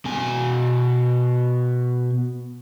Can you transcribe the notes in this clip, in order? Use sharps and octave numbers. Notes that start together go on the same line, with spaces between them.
B2 G#5